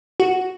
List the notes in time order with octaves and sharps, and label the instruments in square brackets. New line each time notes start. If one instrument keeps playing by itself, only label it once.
[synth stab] F#4